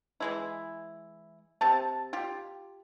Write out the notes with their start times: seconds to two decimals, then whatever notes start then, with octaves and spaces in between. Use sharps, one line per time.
0.20 E3 G#3 E4
1.61 C3 G4 A5
2.13 F4 G4